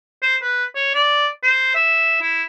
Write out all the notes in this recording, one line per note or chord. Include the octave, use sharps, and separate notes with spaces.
C5
B4
C#5
D5
C5
E5
E4